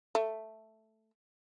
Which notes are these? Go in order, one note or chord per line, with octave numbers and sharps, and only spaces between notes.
A3